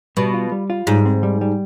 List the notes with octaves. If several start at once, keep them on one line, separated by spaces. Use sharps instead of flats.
B2 G3
F4
G3
F4
G#2 G3
C4
G3
G3